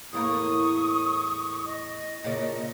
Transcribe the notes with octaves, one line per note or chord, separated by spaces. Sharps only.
E2 A2 A#3 C#6 D#6
D#5
A#2 C#3 D4